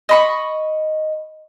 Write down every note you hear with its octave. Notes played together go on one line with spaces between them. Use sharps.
D#5 B5 C#6